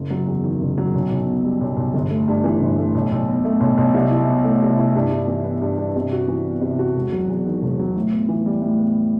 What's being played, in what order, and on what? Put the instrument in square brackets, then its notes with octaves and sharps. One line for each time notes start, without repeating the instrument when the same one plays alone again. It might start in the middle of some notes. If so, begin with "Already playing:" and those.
Already playing: [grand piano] F#1
F#3
E2
D#3
F#1
F#3
B1
B1
B2
G3
B1
B1
G1
A3
G2
E3
G1
A3
B1
B1
B2
A3
B1
B1
C2
E4
B2
A3
C2
E4
G2
G2
E3
B3
G2
G2
C3
F#4
E3
B3
C3
F#4
E1
F#3
E2
D#3
E1
F#3
A2
B3
E3
G3
A2
B3